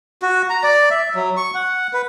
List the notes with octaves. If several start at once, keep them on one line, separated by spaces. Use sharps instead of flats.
F#4
A#5
D5
E5
F#3
C#6
F#5
B4